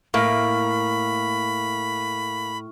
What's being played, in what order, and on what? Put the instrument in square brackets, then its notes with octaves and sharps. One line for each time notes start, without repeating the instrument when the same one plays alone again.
[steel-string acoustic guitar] A2 [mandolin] A#3 [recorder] B5 [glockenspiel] C#6 F6